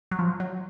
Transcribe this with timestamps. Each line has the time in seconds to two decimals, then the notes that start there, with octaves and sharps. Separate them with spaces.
0.11 F#3
0.19 F3
0.40 F#3